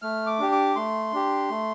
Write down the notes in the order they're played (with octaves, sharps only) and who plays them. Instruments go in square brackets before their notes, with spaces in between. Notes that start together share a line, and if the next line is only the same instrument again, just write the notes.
[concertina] A3 F6
D6
D4 G4
D6
A3 C6
D4 G4
A3